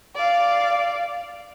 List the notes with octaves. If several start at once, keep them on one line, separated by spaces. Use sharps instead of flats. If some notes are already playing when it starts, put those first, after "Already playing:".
D5 F5